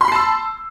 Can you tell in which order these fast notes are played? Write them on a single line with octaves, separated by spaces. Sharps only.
C6 B5 C7 A5 E6